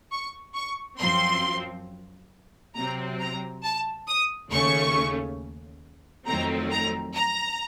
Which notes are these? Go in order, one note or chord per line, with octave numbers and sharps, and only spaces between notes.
C#6
C#6
F#2 F3 C4 C6
C3 F#3 C4 A#5
A#5
A5
D#6
D#2 C#3 A3 C#4 C#6
F2 D#3 F#3 A3 C4 A#5
A#5
A#5